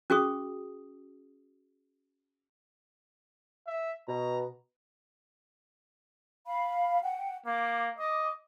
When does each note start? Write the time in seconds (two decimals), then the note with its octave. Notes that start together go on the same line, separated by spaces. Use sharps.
0.10 C#4 F#4 G#4 C#6 D#6
3.67 E5
4.08 B2 A#5
6.47 F5 B5
7.03 F#5 G5
7.46 A#3 D6
7.99 D#5 D6